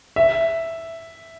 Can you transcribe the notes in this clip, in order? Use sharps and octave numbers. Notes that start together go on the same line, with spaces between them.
E5